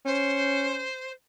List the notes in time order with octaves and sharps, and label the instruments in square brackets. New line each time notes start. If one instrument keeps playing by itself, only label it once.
[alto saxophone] C#4 [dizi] C5